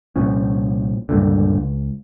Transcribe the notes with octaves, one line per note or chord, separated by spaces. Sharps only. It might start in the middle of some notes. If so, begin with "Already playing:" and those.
C2 A#2 F3 C#4
C#2 G2 A#2 D3
C#2